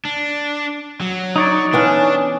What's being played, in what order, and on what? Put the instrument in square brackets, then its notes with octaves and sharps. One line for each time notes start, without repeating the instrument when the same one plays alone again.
[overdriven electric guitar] D4
F#3
[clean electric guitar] D#4 C#5 D5
[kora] E3 B3 C#4 [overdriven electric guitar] D4